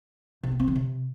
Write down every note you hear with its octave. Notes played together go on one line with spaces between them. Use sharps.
C3
B3
C4
D#3
C3